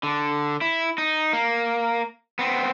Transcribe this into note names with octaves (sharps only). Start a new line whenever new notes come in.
D3
E4
D#4
A#3
B3 C4